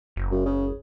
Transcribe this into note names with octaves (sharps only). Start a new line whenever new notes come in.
F#1
F#2
C#3